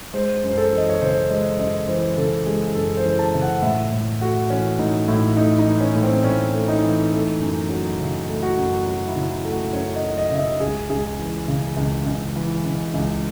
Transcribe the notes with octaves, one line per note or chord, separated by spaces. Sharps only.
G#3 C5
F#2
C5
A4
E3
D#5
C#5
C#3 C5
G#3 D#5
F#2 D#5
E3 C5
C#3 A4
G#3 G#4
F#2 A4
C5
E3
A5
C#3
F#5
A2 E5
A2
A3 F#4
E3 C#4
A2 D#4
A2 E4
A3 D#4
D#4
E3
C#4
A2
C4
A2 C#4
A3
D#4
E3
A3
F#2
F#3
C#3
A3
F#4
F#2
F#3 F#4
E4
C#3
E4
A3
F#4
F#2 C#5
D#5
F#3
D#5
C#3 E5
D#5
C#2 G#4
C#2 G#4
E3
C#3
C#2
C#2
E3
C#3
C#2